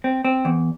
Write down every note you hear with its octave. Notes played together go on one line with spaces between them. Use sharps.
C4
C4
E2